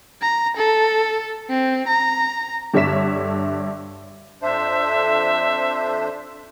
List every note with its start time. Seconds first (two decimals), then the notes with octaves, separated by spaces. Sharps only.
0.21 A#5
0.57 A4
1.49 C4
1.88 A#5
2.74 G2 D3 C#5 E5 B6 E7
4.42 F2 D4 C5 E5